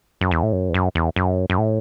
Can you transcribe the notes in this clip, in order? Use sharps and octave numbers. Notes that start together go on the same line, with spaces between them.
F#2
E2
A2
F#2
E2
F#2
E2
F#2
F#2
A2